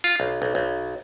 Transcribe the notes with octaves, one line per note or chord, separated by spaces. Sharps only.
F4
B1
B1
B1